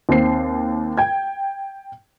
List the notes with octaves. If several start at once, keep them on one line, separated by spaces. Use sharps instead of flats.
D#2 C4 C7
G5 G#6